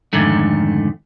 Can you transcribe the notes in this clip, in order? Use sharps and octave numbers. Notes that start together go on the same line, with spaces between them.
F2 G#2 D3 D#3 A3